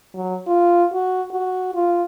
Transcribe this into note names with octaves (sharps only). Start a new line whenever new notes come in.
F#3
F4
F#4
F#4
F4